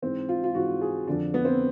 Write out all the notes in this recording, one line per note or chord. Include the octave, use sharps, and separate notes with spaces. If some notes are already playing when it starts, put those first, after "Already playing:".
G#2 E3 C4
F4
F4
G#2 E3 F#4
G#4
F2 D3 F3 D4
B3
C4